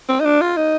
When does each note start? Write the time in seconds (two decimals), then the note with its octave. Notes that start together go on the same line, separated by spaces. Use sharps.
0.09 C4
0.20 D#4
0.25 D4
0.41 F4
0.57 D#4